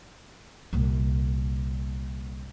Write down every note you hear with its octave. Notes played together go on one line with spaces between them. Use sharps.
C2 A#2